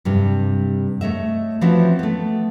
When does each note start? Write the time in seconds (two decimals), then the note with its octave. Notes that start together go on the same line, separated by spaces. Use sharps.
0.05 G2 C3 G3
1.01 A3 C#5 D#5 E5
1.61 E3 F3 C4 C#4 F#4 E5
1.99 A3 B3